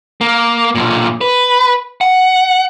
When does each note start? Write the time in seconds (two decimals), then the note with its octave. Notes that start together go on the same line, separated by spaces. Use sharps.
0.21 A#3
0.75 B1 A#2
1.21 B4
2.01 F#5